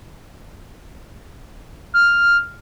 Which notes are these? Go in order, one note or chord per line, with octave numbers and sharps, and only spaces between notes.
F6